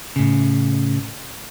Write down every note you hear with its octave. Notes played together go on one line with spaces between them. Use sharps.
A2 C#3